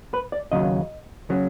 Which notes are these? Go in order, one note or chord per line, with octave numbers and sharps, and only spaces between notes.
B4
D5
D#2 C#3 F#3 D#5
C#3 F#3